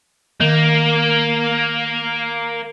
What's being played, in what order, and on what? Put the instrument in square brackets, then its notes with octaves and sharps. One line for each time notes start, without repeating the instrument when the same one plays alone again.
[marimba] D#3 [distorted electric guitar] A#3